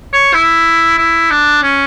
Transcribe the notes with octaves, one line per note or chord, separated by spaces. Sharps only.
C#5
E4
E4
D4
C#4